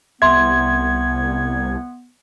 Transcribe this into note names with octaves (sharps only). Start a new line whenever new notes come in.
C2 B3 E5 C6 G#6